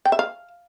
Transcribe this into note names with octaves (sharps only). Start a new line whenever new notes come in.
G5
E5
F5